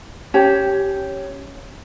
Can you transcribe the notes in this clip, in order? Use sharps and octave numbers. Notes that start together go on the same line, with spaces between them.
C#4 G4 C#5 A5